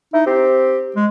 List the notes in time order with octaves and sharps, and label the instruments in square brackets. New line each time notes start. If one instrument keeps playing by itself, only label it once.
[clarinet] D#4 [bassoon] E4
[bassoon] C4 [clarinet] G4
[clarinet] G#3